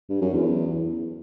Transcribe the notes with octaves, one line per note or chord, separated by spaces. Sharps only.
G2
F#2
E2